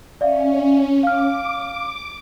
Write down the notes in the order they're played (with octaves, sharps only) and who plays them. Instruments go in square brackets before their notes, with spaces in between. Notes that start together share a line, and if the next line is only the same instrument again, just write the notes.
[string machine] C#4 [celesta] D5 E5 F5
[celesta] F5 F6 [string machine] D6